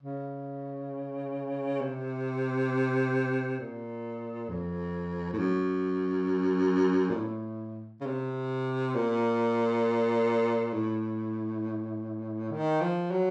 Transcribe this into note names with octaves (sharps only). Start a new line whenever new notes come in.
C#3
C3
A#2
F2
A2
F#2
A#2
A2
C#3
C3
A#2
A2
D#3
F3
F#3